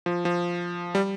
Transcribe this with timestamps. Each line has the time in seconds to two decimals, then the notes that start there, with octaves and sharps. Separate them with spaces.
0.06 F3
0.25 F3
0.95 G3